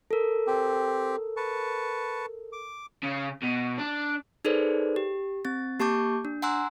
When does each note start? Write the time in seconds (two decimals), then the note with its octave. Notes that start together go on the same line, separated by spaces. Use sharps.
0.11 A4 A#4
0.47 C4 G4
1.37 B4 A5 C#6
2.53 D6
3.03 C#3
3.43 B2
3.79 D4
4.45 D#4 G#4 A4 B4 C5 D5
4.96 G4
5.45 C4 A6
5.80 A#3 G4 A5 C#6 D6 G6
6.25 D4
6.42 F#5 G#5 A#5 C6 E6 F#6